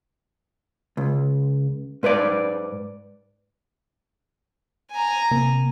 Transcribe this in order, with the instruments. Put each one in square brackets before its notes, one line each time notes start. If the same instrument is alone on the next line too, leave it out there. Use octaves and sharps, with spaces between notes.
[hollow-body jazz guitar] C#2
G#2 B4 C5 D5
[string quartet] G#5 A#5
[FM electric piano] C3 A#3